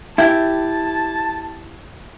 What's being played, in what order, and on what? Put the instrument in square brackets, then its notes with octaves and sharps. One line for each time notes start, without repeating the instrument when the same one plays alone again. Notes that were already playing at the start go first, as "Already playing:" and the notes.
[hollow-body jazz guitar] E4 G4 [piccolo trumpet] A5